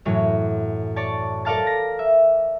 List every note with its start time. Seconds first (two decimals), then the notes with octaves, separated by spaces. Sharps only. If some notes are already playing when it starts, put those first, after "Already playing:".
0.05 F#2 A2 E3 F#3
0.96 C#5 D5 A5 A6
1.45 A4 A#4 D5 F5 A5 A6
1.67 A#6
1.99 E5